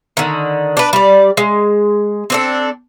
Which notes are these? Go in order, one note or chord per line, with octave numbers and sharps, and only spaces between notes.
D3 D#3
D4 B4
G3 D5
G#3
C4 D4 A4